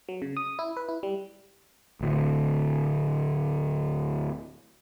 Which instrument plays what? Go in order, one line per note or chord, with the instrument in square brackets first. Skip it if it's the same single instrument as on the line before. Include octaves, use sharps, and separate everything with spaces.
[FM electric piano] F#3
C#3
D#6
E4
B4
E4
G3
[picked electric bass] D1 D2